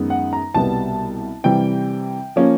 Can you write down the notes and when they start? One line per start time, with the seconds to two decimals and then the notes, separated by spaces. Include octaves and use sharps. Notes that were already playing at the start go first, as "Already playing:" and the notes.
Already playing: F#2 D#3 G#3 B3 D#4
0.10 F#5
0.33 A#5
0.54 C2 B2 G3 B3 A5
1.44 C3 E3 G3 G5
2.36 F3 A#3 C#4